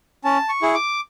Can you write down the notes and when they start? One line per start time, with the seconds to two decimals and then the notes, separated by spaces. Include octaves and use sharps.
0.24 C#4 A5
0.49 C#6
0.62 E4 G#4
0.74 D6